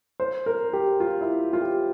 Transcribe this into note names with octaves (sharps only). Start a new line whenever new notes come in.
C5
A#4
G4
F4
E4
F4
G4